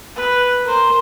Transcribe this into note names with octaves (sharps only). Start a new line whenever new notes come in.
B4
A#4 C5